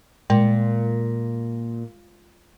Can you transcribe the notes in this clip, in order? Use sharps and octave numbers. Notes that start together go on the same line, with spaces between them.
A#2 G#3